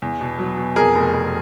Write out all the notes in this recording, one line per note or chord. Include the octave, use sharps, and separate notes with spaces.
E2
B2
F#3
B2
F2 G#4 A#4
F1
F1